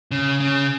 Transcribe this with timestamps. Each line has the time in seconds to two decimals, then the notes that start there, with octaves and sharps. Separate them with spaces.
0.11 C#3
0.40 C#3